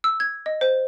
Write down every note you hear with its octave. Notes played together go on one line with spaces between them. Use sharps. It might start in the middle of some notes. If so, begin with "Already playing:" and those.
E6
G#6
D#5
C5